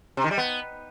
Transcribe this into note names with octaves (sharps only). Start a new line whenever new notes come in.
C3
D#3
G3
B3